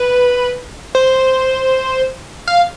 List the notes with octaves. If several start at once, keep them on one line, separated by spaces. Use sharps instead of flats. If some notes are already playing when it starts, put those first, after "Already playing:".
Already playing: B4
C5
F5